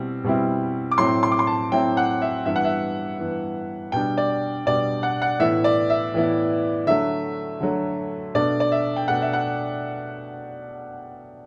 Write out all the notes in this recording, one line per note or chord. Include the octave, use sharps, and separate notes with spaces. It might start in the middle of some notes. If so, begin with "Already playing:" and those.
Already playing: B2 G3 C4 E4
B2 G3 C4 E4
D6
A2 F#3 C4 E4 C6
C6
D6
C6
A5
A2 F#3 C4 E4 G5
F#5
E5
G2 E3 B3 E5
F#5
E5
G2 E3 B3
B2 G3 D4 G5
D5
B2 G3 D4 D5
F#5
F#5
A2 E3 B3 E4 E5
D5
E5
A2 E3 B3 E4
D3 F#3 A3 E5
D3 F#3 A3
B2 A3 D4 D5
D5
E5
G5
B2 A3 D4 F#5
E5
F#5